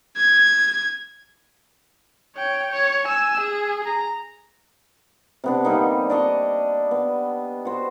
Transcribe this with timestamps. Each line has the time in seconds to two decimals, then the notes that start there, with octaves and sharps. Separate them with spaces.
0.17 G#6
2.37 C#5 G5
2.71 C#5
3.05 G#5 E6
3.40 G#4
3.86 A#5
5.44 C3 B3 D4
5.65 D3 G3 A#3 D#4
6.10 D4 D#5 A#5 C#6
6.91 B3
7.65 F#4 C5